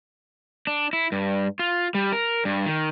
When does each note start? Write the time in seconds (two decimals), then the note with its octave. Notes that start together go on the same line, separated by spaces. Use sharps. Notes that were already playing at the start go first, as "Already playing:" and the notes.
0.67 D4
0.93 E4
1.12 G2
1.59 F4
1.95 G3
2.12 A#4
2.45 G2
2.66 D#3